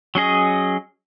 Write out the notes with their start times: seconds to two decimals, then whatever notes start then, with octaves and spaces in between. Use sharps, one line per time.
0.15 F#3 C#4 G#4 D#5